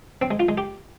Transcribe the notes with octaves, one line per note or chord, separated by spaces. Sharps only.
C4
G#3
F4
G#3
G4